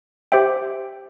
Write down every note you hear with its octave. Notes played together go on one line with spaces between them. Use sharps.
G4 C5 E5 G5